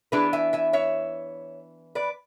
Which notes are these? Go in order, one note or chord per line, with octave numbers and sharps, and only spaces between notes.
E3 B3 D4 G#4 B4
E5 G#5
E5 G#5
C#5 E5
B4 D5